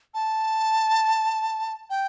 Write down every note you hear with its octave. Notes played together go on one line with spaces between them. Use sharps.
A5
G5